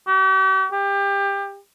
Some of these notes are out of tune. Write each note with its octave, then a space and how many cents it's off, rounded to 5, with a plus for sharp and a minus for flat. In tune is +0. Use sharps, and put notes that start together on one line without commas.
G4 -45
G4 +25